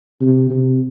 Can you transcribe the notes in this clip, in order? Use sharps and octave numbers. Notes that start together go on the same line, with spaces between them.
C3
C3